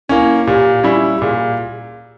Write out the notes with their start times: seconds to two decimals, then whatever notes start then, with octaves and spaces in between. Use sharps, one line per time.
0.09 A#3 C#4 E4
0.47 A#2 G4
0.83 G3 C#4 E4
1.21 A#2 G#4